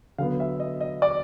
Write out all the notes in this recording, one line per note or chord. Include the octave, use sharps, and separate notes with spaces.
D3 F#3 B3 F5
E5
D#5
D#5
D5